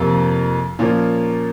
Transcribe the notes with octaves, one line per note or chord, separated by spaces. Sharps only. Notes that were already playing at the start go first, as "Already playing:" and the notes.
Already playing: F2 C3 F3 A#3
A#2 F3 A#3 C#4